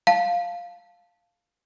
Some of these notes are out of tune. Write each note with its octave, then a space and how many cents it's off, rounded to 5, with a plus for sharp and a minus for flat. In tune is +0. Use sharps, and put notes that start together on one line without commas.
F5 +0 A5 +0